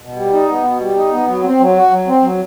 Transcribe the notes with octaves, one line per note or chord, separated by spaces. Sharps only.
B2
G3
D#4
B3
B2
G3
D#4
B3
F#3
C4
F#3
F#4
F#3
C4
F#3